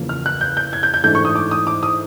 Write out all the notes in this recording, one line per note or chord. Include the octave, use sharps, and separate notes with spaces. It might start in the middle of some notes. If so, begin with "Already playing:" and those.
Already playing: E2 C#3 F3 A#3
F6
F#6
G6
G6
G#6
G6
G6
G#2 E3 A3 D4 G6
C#6
D#6
D6
D#6
D6
D#6